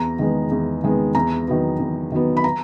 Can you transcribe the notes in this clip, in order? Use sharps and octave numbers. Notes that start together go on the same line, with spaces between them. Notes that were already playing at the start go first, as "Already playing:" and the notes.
Already playing: E2 A#5
D#3 G#3 B3
E2
D#3 G#3 B3
E2 A#5
D#3 F#3 B3
E2
D#3 F#3 B3
B5
A#5